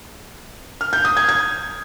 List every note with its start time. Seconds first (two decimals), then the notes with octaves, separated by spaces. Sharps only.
0.81 F6
0.93 G6
1.05 D#6
1.17 G#6
1.29 G#6